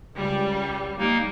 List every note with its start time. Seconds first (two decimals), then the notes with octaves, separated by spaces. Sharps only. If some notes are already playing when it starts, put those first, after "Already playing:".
0.16 C#2 G3
0.98 G3 A#3 D#4